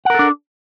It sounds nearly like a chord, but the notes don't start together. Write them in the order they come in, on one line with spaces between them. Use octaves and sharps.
F#5 A#4 A4 D4